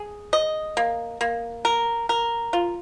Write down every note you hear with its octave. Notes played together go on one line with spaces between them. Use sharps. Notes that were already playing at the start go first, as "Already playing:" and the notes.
Already playing: G#4
D#5
A#3
A#3
A#4
A#4
F4